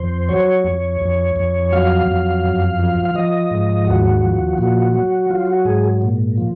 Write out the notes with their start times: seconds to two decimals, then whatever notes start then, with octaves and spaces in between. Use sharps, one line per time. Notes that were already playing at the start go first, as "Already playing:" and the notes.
Already playing: F2 C5
0.29 F#3 C#5
0.65 F2
1.01 F2
1.36 F2
1.72 F#3 F5
2.08 F2
2.44 F#2
2.79 F3
3.05 F5
3.15 F3 D#5
3.51 G#2
3.87 D#2 F#4
4.22 F3
4.58 A#2 F#4
4.94 F#3
5.30 F#3 F4
5.47 F#4
5.65 G#2 G#4
6.02 A#2
6.38 F3